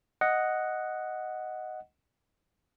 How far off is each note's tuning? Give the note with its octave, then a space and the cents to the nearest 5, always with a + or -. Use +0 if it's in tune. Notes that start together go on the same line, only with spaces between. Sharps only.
D#5 +0 F#5 +0